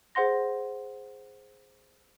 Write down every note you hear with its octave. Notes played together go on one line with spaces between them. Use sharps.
G#4 C5 F#5 C6 A#6